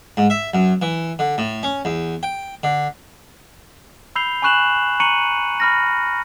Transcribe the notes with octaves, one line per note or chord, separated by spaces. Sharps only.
G#2
E5
F#2
E3
D3
A2
C#4
E2
G5
D3
B5 E6 G6 C7 F7 G7
G#5 B5 C#6 F#6 E7 F#7
A#5 C#6 C#7 D#7 F#7
B5 F6 A#6